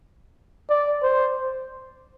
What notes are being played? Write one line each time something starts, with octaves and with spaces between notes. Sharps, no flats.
D5
C5